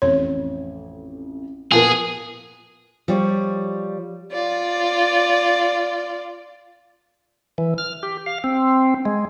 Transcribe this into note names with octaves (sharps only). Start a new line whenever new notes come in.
A1 F2 C#5
A#2 F3 B3 F4 G#4 A#4
F3 G3 C#5
F4 D5
E3
F6
G4
F5
C4
G#3